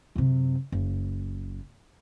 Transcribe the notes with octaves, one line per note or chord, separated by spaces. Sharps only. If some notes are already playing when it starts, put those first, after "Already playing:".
F#2 C3
F#1